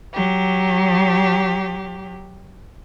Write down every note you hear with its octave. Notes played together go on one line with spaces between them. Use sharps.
F#3 G4